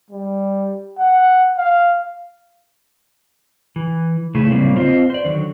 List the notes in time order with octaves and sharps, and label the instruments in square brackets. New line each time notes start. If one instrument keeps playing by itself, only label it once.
[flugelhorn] G3
F#5
F5
[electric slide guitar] E3
C#3 A3 E4 G#4
A2 C#3 F#3 G3 A#3 C4
C4 F4 C5 D#5
C5 D5
D3 D#3 F#3